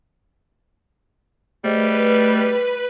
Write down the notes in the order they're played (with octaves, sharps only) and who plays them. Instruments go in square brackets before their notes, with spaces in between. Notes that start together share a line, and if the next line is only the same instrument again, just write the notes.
[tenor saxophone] G3 [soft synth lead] A3 [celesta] G#4 C5 D#5 [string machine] B4